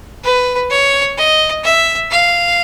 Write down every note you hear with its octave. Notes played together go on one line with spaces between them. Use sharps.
B4
C#5
D#5
E5
F5